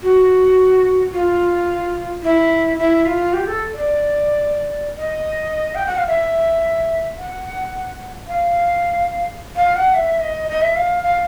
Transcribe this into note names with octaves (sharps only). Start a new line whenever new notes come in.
F#4
F4
E4
E4
F4
G4
A4
D5
D#5
G5
F#5
F5
E5
F#5
F5
F5
F#5
E5
D#5
D#5
E5
F5
F5